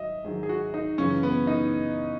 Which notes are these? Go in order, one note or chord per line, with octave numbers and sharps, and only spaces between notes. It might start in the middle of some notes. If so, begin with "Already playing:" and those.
Already playing: G#2 D#3 F#3 D#5 E5
G#2 D#3 F#3 G#4
G#4
F#4
D#4
F#2 C#3 E3 C#4
B3
D#4